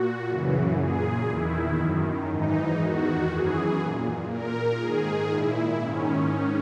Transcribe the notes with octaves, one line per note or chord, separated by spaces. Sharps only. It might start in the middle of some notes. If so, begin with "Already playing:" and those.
Already playing: A#2 F#4
F#2 C#3 E3
A#2 G#4
E2 D#3 E4
F#2 D#3
G#2 E3 D#4
E2 D#3 F#4
F#2 E3 G#4
A#2
A#2 A#4
G#2 D#3 G#4
A#2 E4
G#2 D#3 C#4